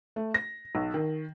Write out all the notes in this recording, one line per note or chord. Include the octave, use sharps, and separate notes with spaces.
A3
A#6
B1
D#3